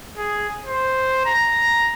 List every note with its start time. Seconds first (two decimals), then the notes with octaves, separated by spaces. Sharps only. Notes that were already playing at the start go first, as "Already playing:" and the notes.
0.18 G#4
0.66 C5
1.26 A#5